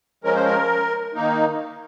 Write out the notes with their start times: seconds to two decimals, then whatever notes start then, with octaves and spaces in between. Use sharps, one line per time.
0.24 F3 G#3 C#4 A#4
0.34 C5
0.45 A#4
1.14 D#3 A#3 D#4